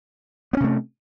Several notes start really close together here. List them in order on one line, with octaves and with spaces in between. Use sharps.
B3 C#4 C3 A3